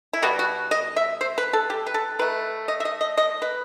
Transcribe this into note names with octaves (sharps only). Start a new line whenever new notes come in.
E4
B2 G3 B3 F#4
F#4
D#5
E5
C5
B4
A4
G4
B4
A4
D#3 A3 B4
D#5
E5
D#5
D#5
D#5
B4